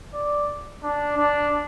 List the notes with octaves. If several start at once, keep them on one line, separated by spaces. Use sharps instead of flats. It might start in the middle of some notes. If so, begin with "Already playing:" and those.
D5
D4
D4